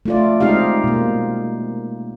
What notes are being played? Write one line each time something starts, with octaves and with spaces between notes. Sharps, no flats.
A3 F4 D5
G#3 C4 D#4 F4 G4 F5
B2 A#3